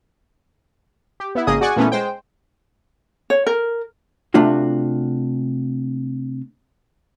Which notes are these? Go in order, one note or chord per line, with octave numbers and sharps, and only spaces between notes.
G4
B3 E4
G#1 C#3 A#3 G#4 D#5 D#6
F#4 G#4 D5 F#5 G#5 C#6
A#2 E3 A3 B3 C#4
G#3 C5 G5
C#5
A#4
C3 A3 D4 F4 F#4